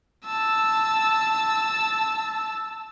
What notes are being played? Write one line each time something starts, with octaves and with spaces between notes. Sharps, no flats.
A5 E6